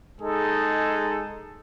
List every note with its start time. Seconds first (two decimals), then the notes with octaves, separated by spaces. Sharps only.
0.20 G#3 D#4 G#4 A4